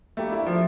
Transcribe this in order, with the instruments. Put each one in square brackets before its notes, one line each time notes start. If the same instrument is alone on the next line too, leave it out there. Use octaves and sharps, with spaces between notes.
[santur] G3 A#3 D4 G4 [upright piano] A3
[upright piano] E4
F3